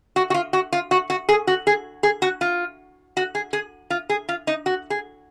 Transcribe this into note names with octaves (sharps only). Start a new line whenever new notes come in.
F#4
F#4
F4
F#4
F4
F#4
F#4
G#4
F#4
G#4
G#4
F#4
F4
F#4
G#4
G#4
F4
G#4
F4
D#4
F#4
G#4